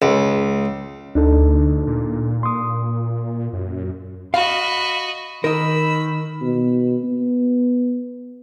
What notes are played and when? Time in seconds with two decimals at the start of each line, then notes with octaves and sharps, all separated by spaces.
0.02 C#2
1.15 D2 D4 D#4 A4
1.87 A#2
2.43 C6 D#6
3.53 F#2
4.34 F#4 D#5 F5 B5
5.44 D#3 A#4 D#5 B5 E6
6.42 B2
7.04 B3